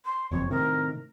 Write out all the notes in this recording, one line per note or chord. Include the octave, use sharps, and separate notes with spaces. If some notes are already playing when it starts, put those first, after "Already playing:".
C6
F#1 F2 C#5
A2 C3 D#3 A#4